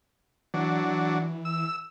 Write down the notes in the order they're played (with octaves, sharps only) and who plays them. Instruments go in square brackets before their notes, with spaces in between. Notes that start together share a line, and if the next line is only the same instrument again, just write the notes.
[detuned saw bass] E3 [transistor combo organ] F#3 D4
[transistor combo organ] E6